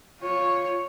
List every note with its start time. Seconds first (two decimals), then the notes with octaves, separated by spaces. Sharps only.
0.20 F4 C#5